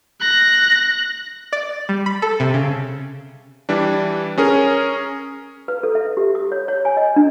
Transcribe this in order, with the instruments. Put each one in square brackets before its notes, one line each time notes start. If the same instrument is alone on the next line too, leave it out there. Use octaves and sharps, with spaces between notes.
[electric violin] F#6 A#6
[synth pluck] D5
G3
B5
A4
C3
C#3
[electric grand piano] E3 G3 D4
C#4 G#4 A#4
[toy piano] B4
A4
E5
G4
D#6
C#5
C#5
G#5
D#5
D4